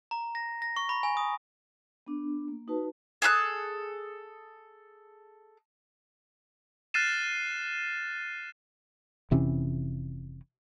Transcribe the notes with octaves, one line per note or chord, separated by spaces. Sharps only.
A#5
A#6
A#6
C#6
B5
G#5
D#6
B3 D4
A#3
D#4 F#4 B4 A5
G#4 A4 D#6 F#6
F6 F#6 A6 C7 D#7 E7
F1 C3 E3 C#4